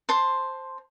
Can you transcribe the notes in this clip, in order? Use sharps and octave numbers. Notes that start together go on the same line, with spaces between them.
C5 A5 C6